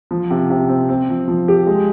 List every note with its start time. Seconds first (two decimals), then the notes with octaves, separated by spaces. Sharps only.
0.11 F3
0.31 C3
0.50 C3
0.69 C4
0.89 C4
1.09 F3
1.28 F3
1.48 G4
1.67 G#3